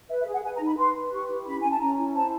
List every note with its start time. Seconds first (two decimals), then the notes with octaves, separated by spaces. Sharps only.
0.09 B4 E5
0.20 E5
0.26 G#4
0.32 F#5
0.43 B4 G#5
0.55 A#5
0.60 D#4
0.66 B5
0.77 B4 C6
0.95 B4
1.12 G4 C#6
1.29 E4
1.46 C#4 B5
1.61 C#4 G#5
1.71 A5
1.80 C#4 A#5
1.97 E4
2.15 C5 A5